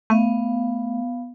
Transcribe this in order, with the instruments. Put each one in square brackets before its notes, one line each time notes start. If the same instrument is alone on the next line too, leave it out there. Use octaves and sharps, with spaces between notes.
[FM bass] A3 [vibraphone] B3 F5